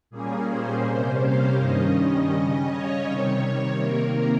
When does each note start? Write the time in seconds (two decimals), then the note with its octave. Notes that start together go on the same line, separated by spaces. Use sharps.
0.10 A#2 G3 A#3 C#4 G#4
0.47 C5
0.84 C3 G3 A#3 C#4
1.21 F5
1.57 G2 D#3 G3 C#4 D#5
1.94 D#5
2.31 C#3 G3 C#4 D#5
2.69 C#5
3.06 C3 D#3 G3
3.79 C3 D#3 A#3 A#4